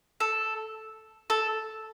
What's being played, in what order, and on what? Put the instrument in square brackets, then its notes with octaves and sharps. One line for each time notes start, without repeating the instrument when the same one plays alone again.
[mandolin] A4
A4